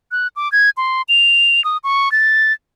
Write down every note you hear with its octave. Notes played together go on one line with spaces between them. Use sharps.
F#6
D6
G#6
C6
F7
D#6
C#6
A6